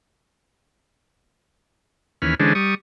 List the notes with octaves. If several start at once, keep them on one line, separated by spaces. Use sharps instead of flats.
D#2 E3 C#4 B5 F6
D3 E3 G#3 C#4 D4 C5
G3 C#6 D#6